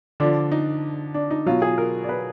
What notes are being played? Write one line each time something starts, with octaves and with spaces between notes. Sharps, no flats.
D3 F3 D4
D#4
D4
D#4
B2 F#3 F4
G#4
A#4
D5
B4